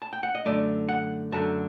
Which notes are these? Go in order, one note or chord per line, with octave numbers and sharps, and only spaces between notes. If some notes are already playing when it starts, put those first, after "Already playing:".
A5
G5
F#5
D#5
F#2 D3 A3 D5
F#5
F#2 D3 A3 A5